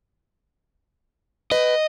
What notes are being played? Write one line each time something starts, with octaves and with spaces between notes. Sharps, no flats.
B4 D#5 G5